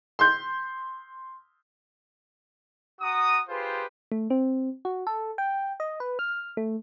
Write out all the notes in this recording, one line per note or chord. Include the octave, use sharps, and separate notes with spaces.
C6 G6
F#4 A#5 D#6
F4 G4 G#4 B4 C5
A3
C4
F#4
A4
G5
D#5
B4
F6
A3